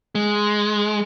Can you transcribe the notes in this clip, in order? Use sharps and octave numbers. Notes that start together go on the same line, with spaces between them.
G#3